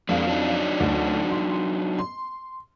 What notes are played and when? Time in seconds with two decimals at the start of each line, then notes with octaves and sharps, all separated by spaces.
0.09 F2 G#3 A#3 D4 F5
0.27 F#3 D4 D#4
0.80 D2
1.31 C6
1.99 C6